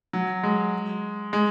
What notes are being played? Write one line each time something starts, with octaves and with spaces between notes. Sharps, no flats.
F#3
G#3
G#3